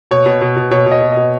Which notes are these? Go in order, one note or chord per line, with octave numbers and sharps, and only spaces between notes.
B2 C#5
B2
B2
B2
B2 C#5
B2
D#5
B2
B2 D#5